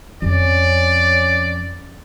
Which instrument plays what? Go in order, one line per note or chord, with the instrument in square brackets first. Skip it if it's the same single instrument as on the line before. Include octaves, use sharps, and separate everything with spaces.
[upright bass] F2 [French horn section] C#4 [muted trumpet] D5